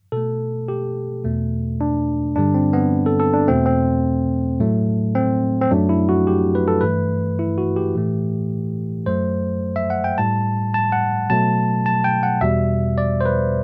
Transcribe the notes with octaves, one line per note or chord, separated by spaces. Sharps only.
B2 A3 A4
G4
E2 B2 A3
D4
G2 D3 G3 D4
C4
B3
A4
A4
D4
E2 B2 A3 C4
C4
A2 F#3 A3
C4
C4
F#2 F#3 A3 D4
E4
F#4
G4
B4
A4
G2 E3 A3 B4
E4
F#4
G4
A2 E3 A3
F#2 F#3 A3 C5
E5
F#5
G5
A2 G3 A5
A5
F#5
B2 F#3 A3 A5
A5
G5
F#5
E2 B2 G3 E5
D5
C5
B4